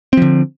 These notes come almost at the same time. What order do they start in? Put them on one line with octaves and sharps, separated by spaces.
C4 F3 D3